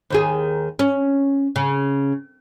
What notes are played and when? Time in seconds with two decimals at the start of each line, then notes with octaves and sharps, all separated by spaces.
0.10 D#2 D#3 G#4
0.79 C#4
1.56 C#3